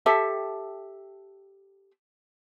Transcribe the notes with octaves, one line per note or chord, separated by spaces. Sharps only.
G4 A4 E5